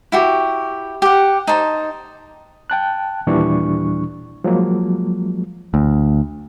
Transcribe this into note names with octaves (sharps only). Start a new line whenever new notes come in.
E4 F#4 G4
G4 F#5
D#4 C5 A5
G5 A5 F#6
D#2 A#2 E3 G3 D4 C#6
F3 F#3 G#3 A#3
D2